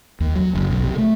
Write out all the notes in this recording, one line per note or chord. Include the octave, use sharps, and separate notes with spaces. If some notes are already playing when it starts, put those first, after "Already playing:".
D#2
F#3
F#1
B1
C3
A3